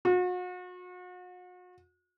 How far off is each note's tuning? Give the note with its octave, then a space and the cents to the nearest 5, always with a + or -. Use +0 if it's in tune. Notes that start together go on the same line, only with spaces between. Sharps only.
F#4 -40